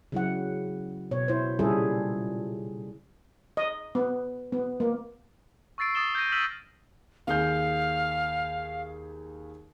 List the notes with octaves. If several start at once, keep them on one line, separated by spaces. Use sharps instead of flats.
C#3 F#3 E4 F#5
B2 C#5
E4 C5
A#2 C#3 G3 E4 G#4 A4
D#5
B3
B3
A#3
C#6 E6 A6 C7 D7
D#6 A6 E7 G7
G6 G#6 A#6 D#7
E6 F6 B6 D#7 E7 F#7
D#2 G#4 F5 G6